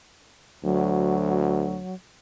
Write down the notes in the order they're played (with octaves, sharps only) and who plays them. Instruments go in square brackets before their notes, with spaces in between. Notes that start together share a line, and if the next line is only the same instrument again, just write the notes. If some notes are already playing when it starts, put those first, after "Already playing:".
[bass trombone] D2 [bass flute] F#3